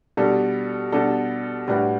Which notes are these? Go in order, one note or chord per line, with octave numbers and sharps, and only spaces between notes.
B2 G3 D4 A4
B2 G3 D4 A4
A2 G3 D4 F#4 B4